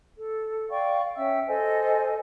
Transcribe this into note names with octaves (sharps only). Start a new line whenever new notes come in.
A4
D5 F5 G5 C#6
C#4 E5 G5 E6
A4 C5 D#5 G#5